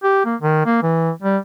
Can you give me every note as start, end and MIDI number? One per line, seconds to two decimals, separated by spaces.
0.03 0.25 67
0.25 0.35 58
0.41 0.63 51
0.66 0.78 58
0.82 1.10 52
1.22 1.38 55